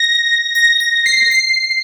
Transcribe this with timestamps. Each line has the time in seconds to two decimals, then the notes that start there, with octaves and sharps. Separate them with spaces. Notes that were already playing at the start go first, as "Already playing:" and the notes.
Already playing: A#6
0.55 A#6
0.80 A#6
1.06 C7
1.31 C7